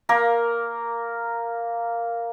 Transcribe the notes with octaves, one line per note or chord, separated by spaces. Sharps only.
A#3 A#4